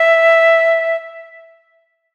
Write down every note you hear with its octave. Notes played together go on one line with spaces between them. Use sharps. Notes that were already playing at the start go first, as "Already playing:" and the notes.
Already playing: E5